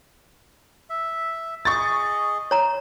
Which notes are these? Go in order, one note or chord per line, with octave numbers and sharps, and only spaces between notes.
E5
G#4 D#5 C#6 A6
C#5 A#5